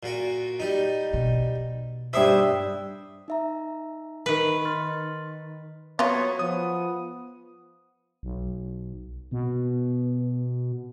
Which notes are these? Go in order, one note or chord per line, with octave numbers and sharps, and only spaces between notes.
A#2 F#4
G3 D#4
B2
G2 E4 C5 E5 D#6 E6
D#4 E5 A#5
D#3 B4
C6 F6 A6
F#3 B3 F4 C#5
F3 B3 D#6
B1
B2 B3